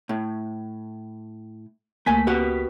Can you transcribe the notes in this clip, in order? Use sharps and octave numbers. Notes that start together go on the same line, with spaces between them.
A2
C#2 A3 A#3 G#5 B6
F#4 G4 B4